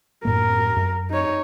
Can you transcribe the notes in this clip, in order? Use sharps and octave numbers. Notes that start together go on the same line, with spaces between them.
F#2 A2 A#3 A#4
F#2
D#4 C#5